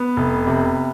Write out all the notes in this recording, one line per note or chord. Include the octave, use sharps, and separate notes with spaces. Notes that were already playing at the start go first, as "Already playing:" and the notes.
Already playing: B3
F1
C3